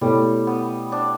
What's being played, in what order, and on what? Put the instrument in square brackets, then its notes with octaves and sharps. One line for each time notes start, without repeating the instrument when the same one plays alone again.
[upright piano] B2 A3 E4 A4 C#5 [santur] G3
[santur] B3
D4